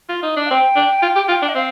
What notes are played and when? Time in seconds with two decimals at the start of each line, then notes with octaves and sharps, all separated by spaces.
0.09 F4
0.23 D#4
0.36 D4
0.46 F5
0.50 C4 G5
0.76 D4
1.03 F4
1.16 G4
1.29 F4
1.42 D4
1.49 D#5
1.55 C4 F5